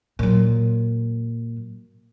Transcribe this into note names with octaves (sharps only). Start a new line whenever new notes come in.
A#2 F#3